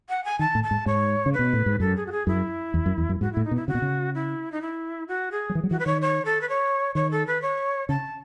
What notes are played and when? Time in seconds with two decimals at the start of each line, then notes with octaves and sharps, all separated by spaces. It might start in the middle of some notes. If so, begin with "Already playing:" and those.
0.09 F#5
0.24 G#5
0.39 D#3 A5
0.55 A2
0.63 A5
0.71 G#2
0.86 G#2 C#5
1.26 C#3
1.33 B4
1.39 B2
1.53 A2
1.66 G#2
1.80 F#2 A4
1.96 G#4
2.06 F#4
2.11 G#4
2.27 F#2 E4
2.74 E2
2.86 F#2
2.98 E2
3.09 F#2
3.21 G#2 F#4
3.32 A2 E4
3.44 D#4
3.51 B2
3.56 E4
3.68 C#3 F#4
3.75 B2
3.82 C#3
4.14 E4
4.52 D#4
4.61 E4
5.08 F#4
5.31 G#4
5.49 F#3
5.55 E3
5.64 F#3
5.70 E3 F#4
5.79 B4
5.86 D#3 C#5
6.01 C#5
6.25 A4
6.41 B4
6.49 C#5
6.95 D#3 C#5
7.11 A4
7.27 B4
7.42 C#5
7.89 C#3 A5